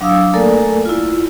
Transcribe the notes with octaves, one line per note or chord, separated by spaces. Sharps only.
F#3 D4 F5 D#6 E6
A3 A#3 A4 A#4 D5 G#5
E4 F4